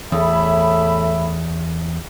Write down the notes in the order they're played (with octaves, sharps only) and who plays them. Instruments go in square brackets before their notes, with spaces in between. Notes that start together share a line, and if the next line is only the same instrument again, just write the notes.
[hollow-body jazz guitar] E2 [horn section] A2 E5 B5